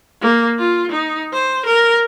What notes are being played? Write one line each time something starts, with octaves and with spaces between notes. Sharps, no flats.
A#3
F4
D#4
C5
A#4